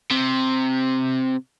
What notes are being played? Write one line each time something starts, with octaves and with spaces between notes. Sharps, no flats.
C3